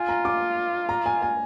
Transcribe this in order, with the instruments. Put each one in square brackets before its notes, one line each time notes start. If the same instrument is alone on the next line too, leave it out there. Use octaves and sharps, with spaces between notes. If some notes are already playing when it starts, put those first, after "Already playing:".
Already playing: [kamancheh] F4 [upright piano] G#5
[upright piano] A#5
D6
A#5
G#5
G#5